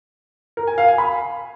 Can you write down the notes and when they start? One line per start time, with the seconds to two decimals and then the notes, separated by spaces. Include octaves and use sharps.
0.57 A#4
0.67 G#5
0.78 F5
0.88 G#5
0.98 B5